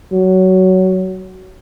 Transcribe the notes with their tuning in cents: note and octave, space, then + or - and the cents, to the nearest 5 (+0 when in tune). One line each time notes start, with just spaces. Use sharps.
F#3 +15